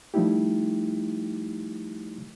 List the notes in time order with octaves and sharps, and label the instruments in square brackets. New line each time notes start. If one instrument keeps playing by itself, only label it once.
[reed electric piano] F3 G3 A3 D#4 E4 G4